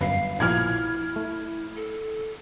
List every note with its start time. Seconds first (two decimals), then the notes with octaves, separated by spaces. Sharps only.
0.01 G1 F#2 B4 F5
0.40 A#1 B2 F3 E4 F6 G#6
1.16 A3
1.76 A4